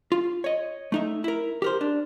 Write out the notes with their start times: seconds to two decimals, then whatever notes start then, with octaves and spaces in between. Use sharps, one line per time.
0.12 F4
0.44 C#5 D#5
0.92 A3 D#4 E5
1.24 E4 A#4
1.62 G4 A#4 C5
1.81 D4